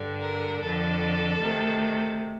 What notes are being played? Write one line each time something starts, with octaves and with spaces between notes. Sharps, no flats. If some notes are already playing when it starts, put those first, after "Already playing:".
Already playing: G2 D3
A#4
F2 D3 A4
D2 C3 D#3